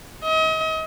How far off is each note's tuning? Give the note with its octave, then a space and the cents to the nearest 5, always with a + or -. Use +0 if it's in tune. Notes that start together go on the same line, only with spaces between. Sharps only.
D#5 +35